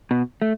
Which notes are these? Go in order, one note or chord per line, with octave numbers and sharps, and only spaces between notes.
B2
A3